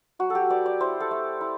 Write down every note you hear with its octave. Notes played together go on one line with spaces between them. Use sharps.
F#3 F#4
A4
G4
B3 D5
D5
E4 C5
A4
A3
E4